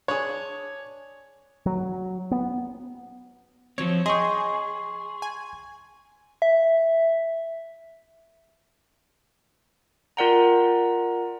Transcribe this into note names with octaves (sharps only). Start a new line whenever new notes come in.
D4 G#4 C#5
F#3
B3
F3 F#3 C4 C#5
G#4 D#5 G5 C6 C#6
G#5
E5
F4 A#4 D5 F#5 G5 A#5